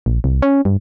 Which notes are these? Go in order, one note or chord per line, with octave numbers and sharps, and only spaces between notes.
A#1
C2
C#4
G2